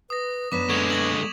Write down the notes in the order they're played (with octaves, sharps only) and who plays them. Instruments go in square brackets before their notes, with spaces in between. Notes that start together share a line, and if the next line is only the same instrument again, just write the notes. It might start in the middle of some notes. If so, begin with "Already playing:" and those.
[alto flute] B4 [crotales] D#6 A#6
[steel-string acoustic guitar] F#2 B3 D4 [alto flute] B4 [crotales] D6 B6 E7
[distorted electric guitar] D3 G#3 [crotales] C#6 G#6 F7
[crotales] G#6 A#6 F#7